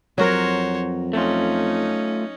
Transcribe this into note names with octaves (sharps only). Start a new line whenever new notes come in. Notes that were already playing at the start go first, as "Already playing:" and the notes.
F2 F#3 F#4 A#4 C5 C#5
A3 C#4 D#4 F4